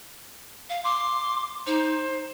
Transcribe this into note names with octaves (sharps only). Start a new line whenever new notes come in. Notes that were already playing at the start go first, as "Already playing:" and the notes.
F5
C6 D6
D#4 C5